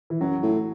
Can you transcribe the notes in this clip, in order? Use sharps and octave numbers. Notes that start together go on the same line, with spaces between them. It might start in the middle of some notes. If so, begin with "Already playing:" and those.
E3
F#2 F#3
A2